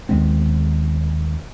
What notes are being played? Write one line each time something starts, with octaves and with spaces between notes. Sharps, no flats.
D#2 G#3 B3 C4